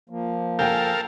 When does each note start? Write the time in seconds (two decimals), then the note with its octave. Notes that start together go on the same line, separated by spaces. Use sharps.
0.10 F3 A#3
0.59 A4 A#4 F5 G5 G#5 G6